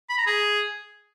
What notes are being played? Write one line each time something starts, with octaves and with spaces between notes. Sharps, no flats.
B5
A#5
G#4